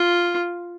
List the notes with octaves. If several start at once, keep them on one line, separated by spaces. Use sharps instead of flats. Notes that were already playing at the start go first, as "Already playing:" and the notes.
Already playing: F4